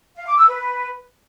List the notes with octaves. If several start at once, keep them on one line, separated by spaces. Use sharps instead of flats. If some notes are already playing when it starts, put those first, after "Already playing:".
F5
D6
E6
B4